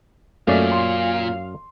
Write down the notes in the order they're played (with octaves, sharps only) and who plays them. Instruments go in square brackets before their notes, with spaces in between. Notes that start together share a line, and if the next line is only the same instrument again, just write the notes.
[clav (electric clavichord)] F#2 C#4 D5 [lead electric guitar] A#2 [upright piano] A3 [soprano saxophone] F5
[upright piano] C6